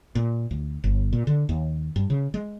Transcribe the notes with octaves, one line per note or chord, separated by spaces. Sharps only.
A#2
D2
G1
A#2
D3
D#2
G2
C#3
G#3